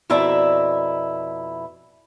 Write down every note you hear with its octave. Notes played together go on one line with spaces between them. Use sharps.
F2 B2 E4 D5 E5 A#5